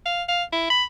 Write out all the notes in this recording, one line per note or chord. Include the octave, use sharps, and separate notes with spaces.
F5
F5
E4
B5